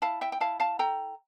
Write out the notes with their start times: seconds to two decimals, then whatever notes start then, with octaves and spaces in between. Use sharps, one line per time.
0.02 E4 F5 A5
0.21 E5 G5
0.32 G5
0.40 E4 F5 A5
0.60 F5 A5
0.79 A4 G5 A#5